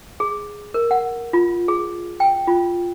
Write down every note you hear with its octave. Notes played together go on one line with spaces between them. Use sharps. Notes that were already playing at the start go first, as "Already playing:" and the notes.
G#4
A#4
F#5
F4
G#4
G5
F4